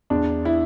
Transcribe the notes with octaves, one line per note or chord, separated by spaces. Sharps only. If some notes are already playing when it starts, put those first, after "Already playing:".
E2 D4
E4